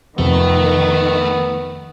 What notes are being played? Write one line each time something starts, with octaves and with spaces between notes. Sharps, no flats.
F2 C3 D#3 F3 A3 B3